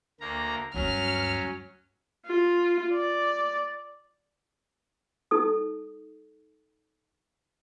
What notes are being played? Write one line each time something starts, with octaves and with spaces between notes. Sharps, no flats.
D2 A#3 A#5
D2 G2 F#3 C#4 F6
F4
D5
D#4 A4 D#6